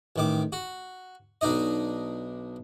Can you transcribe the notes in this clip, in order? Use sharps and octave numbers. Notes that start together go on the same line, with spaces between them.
A1 D#3 D6
F#4
B1 D4 D#4 D#5